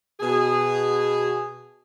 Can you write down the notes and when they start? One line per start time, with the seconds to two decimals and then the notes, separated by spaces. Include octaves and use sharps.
0.20 B2 G#4